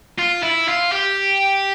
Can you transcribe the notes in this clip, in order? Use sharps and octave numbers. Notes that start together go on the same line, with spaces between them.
F4
E4
F4
G4